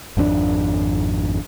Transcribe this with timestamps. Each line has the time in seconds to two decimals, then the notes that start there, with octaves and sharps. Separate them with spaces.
0.17 G#1 F2 C4 D4